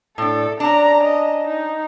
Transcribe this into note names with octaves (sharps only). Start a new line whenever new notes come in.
A2 D4 A4
C#4 D4 A#5
D#5
D#4